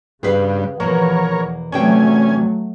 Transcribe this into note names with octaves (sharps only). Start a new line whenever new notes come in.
G2 C#3 G#4 B4 F5
E2 B2 F3 A#3 B3 A#4 C#5
E2 C3 F#3 A3 C#4 G5 G#5